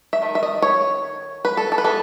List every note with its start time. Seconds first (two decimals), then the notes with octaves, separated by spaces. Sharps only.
0.13 E5
0.22 D#3 A3
0.35 E5
0.43 D#5
0.62 C#5
1.45 B4
1.57 A4
1.72 A4
1.78 B4
1.84 E3 B3 A4